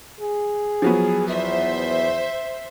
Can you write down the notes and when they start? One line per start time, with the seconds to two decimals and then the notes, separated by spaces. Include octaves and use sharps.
0.21 G#4
0.82 F3 F#3 B3
1.29 E2 C5 E5